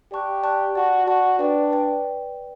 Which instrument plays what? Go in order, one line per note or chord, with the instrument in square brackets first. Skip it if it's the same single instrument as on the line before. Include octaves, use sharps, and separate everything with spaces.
[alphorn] G4 [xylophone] D5 A5 C#6 F#6
[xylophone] D5 A5 C#6 F#6
[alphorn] F#4 [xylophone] D5 A5 C#6
[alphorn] F#4 [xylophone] D5 A5 C#6
[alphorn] D4 [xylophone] B4 D5 G5
[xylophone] B4 D5 G5